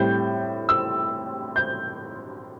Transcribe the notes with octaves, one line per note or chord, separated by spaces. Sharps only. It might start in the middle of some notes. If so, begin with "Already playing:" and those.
Already playing: A2 G3 C4 G6
E6
G6